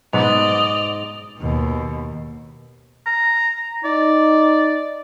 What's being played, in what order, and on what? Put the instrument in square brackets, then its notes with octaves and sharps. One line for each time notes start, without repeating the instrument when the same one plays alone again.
[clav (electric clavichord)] G#2 [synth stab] B2 F#3 B3 [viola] D5 D#5 [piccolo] F7
[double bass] D#2 B2
[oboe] A#5
[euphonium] D#4 [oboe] D5